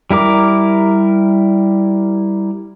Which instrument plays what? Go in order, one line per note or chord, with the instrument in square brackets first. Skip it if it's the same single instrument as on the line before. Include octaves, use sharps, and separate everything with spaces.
[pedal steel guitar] G3 E4 A#4 D6